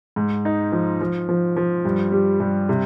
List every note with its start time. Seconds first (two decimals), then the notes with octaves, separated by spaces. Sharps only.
0.16 G#2
0.45 D#4
0.72 F3
1.01 F3
1.29 F3
1.56 F3
1.85 G2
2.12 G3
2.40 G2
2.69 C3